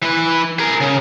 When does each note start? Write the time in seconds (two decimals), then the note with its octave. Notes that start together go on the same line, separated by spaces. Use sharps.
0.02 E3 B4
0.59 G#4 A#4
0.81 C#3